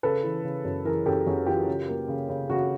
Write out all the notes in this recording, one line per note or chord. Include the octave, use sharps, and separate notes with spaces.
C#3 A4 B4
E3
C#3
F#2
E3 G#4 A#4
F#2 G4 A4
F#2 F#4 G#4
E3 F4 G4
C#3
A#3
C#3
C#3
C#3 F#4